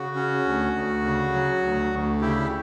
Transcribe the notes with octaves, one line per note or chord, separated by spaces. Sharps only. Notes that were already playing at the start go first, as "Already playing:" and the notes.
Already playing: C#3 F#4
C#4
D2
D2
C#3
F#3
D2
D2
C#3 E4 G4